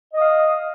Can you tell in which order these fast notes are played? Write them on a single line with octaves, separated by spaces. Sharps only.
D#5 D#6 F5